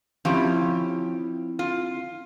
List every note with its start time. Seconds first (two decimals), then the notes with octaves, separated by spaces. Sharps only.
0.25 F3 C4 C#4 E4 G4
1.59 F4